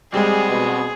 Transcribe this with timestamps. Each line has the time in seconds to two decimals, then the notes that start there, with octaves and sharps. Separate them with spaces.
0.14 G3 G#3 B3 C4 G#4
0.47 B2